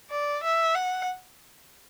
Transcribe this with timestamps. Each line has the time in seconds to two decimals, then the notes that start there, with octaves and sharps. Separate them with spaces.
0.10 D5
0.43 E5
0.75 F#5